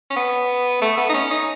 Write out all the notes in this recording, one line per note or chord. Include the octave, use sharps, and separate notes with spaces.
C#4
B3
A3
B3
D#4
C#4
D#4